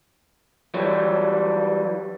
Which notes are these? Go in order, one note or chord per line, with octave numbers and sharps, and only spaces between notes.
E3 F#3 G3